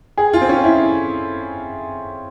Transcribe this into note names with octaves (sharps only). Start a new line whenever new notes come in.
G#4
F4
C4
C#4
E4